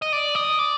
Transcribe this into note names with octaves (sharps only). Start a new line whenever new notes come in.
D#5
D5
D#5
D5